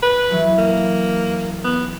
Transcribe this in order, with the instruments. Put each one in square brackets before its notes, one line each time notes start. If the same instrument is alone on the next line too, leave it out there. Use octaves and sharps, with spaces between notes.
[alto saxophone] B4
[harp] E3 F#3 A3
[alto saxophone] A#3
B3